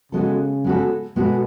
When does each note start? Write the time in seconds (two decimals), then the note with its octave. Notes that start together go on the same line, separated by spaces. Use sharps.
0.12 C#3 G#3 B3 F#4 A4
0.64 G#3 B3 F#4 A4
1.16 B2 G#3 B3 F#4 A4